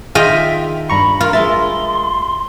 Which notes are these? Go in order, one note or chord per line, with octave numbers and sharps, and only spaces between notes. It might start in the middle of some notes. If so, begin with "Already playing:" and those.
D#3 F4 G#4 D#5 E5 G5
G2 A#5 B5 C#6
F4 A#4
G#3 A#4 E5 C6 A6